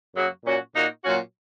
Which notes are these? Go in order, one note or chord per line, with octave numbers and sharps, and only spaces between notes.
F#2 C#3 F#3 A#3 F#4
A#2 F#3 C#4 F#4
A#2 A#3 D#4 F#4
A#2 F#3 C#4 F#4